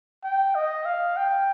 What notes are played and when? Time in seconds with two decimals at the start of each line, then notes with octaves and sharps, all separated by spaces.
0.24 G5
0.55 D#5
0.86 F5
1.17 G5